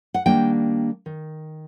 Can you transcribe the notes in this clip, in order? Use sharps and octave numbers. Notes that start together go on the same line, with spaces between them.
F#5
D#3 G3 A#3 D4 G5
D#3